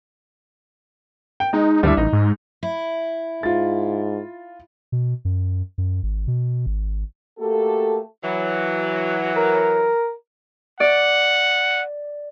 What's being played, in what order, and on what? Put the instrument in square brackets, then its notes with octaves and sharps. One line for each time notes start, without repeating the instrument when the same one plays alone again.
[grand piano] G5
[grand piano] G#3 [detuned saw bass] D#4
[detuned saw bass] D2 [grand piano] G3 D4 E4
[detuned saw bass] A1 [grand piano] D#4
[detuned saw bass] G#2
[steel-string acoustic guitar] E4
[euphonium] G#2 [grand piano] F4 A6
[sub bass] B2
F#2
F#2
G#1
B2
G#1
[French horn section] A3 A#3 F#4 G4 A4
[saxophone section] E3 F#3
[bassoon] A#4
[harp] D5 [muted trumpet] F#5